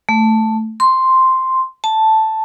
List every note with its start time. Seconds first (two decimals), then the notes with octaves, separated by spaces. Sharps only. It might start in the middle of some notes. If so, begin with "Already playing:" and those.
0.09 A3
0.80 C6
1.84 A5